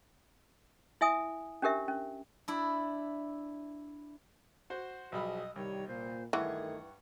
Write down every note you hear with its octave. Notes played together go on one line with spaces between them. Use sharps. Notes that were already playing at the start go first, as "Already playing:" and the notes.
E4 E5 G#5 D#6
C#4 D4 G4 A#4 E5
C#4
D4 E4
F#4 C5
B1 F3 G3 F#4 G#4 D#5 B5
C2 D#3 G3 C#5
A#2 C5
G2 D#3 E3 A3 G#4 F#5 C#6